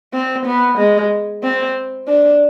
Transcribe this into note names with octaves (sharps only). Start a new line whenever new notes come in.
C4
B3
G#3
C4
D4